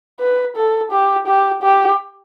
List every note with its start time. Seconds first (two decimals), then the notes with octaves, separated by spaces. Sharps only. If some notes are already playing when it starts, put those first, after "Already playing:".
0.20 B4
0.56 A4
0.92 G4
1.27 G4
1.62 G4